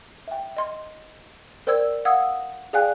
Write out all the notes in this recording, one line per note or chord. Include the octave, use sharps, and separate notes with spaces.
E5 G5
D#5 C6
A#4 C5 D5 G5 E6 G#6
F5 F#5 D#6 E6 G#6
G#4 D5 F5 G5 G#5 F#6